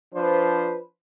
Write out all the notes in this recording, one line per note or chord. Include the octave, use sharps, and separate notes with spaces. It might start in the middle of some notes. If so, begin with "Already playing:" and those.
F3 D4 B4 C5